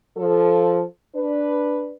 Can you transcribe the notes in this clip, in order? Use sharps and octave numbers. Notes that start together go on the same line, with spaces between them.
F3 A4
D4 B4